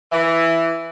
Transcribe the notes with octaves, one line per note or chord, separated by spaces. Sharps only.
E3